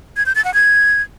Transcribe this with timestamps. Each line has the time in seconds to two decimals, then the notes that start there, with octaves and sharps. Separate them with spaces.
0.17 G#6
0.26 G6
0.35 A6
0.45 F#5
0.54 G#6